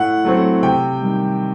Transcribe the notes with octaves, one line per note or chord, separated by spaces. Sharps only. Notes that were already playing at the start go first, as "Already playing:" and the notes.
Already playing: A2 F#5
F#3 A3 C4
C3 G5
D#3 G3